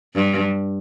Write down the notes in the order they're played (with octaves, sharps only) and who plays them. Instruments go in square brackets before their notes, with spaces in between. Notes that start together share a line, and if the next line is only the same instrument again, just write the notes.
[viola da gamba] G2